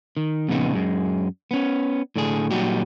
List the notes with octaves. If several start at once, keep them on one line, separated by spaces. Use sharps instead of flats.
D#3
F2 A#2 C#3 B3 D#4
F#2 G#3
B3 C#4
A2 D3 D4 G#4
A#2 F#3 G3 D#4 F#4 G4